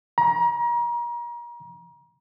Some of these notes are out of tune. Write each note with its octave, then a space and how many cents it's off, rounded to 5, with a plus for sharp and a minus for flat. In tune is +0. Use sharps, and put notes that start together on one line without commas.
A#5 +35